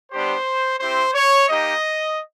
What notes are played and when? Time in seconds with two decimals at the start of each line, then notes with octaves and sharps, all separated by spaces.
0.11 G3 B3 D4 G4 C5
0.80 C4 E4 G4 C5
1.14 C#5
1.48 A#3 D#4 G4 D#5